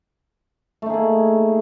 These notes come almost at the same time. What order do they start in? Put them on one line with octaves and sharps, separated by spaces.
A3 D#4 G#4 A#3